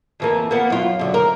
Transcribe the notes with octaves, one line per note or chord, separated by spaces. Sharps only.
F2 E3 A#3
A#3 B3
F#2 F4
F#2 D3
A#4